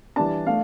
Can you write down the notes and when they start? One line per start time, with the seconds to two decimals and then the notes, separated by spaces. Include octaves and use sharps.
0.16 E3 G3 D4 A5
0.47 A3 D4 F5